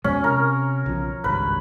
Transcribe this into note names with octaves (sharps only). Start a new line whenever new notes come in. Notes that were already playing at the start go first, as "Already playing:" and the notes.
F2 B2 G#3 C#4
C3 A#4
B1 C#3 F3
G#1 C#2 G2 B4